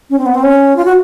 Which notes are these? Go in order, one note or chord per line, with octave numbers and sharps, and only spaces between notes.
C#4
C4
B3
C4
C#4
F4
F#4